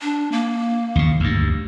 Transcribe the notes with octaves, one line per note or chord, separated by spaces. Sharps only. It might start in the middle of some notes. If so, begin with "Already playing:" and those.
D4
A#3
D#2 C#3
D2 G2